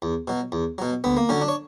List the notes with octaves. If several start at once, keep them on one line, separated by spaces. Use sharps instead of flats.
E2
B2 F#3
E2
B2 F#3
D2 B3
A#3
D3 F#3 C#4
D4
C#5